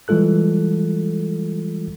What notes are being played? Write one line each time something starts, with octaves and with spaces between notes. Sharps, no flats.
E3 G3 G#3 F4 A4 F#6